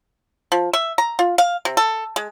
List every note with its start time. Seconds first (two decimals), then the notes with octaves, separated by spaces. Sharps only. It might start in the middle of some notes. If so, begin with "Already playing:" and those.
0.52 F3
0.73 E5
0.98 A#5
1.19 F4
1.38 F5
1.65 C3
1.77 A4
2.16 G#3